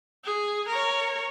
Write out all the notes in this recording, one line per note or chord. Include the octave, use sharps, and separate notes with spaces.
G#4
A#4 C#5